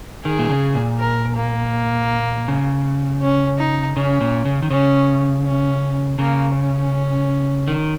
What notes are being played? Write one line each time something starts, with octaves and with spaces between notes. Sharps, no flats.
D#3 G#4
A#2
C#3
A#2
A#4
A#3
C#3
C#4
D#4
C#3 C#4
A#2
C#3
D#3
C#3 C#4
C#4
C#3 A#3
C#4
D#3